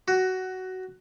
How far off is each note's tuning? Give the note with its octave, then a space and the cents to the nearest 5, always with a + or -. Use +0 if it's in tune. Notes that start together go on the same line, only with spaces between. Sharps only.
F#4 +15